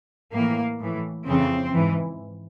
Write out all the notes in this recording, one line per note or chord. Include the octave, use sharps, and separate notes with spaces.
A2 A#3
E3
A2 E3
F2 C#3 E3 C4
G#2 E3